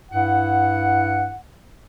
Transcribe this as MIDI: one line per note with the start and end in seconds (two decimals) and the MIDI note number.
0.11 1.34 43
0.11 1.34 64
0.11 1.34 78